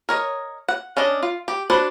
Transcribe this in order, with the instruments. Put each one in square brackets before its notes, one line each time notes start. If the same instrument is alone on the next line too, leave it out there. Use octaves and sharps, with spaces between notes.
[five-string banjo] A#4 C#5 D#5
F#5
C#4 D4 D#5
F4
G4
D4 F#4 B4 C5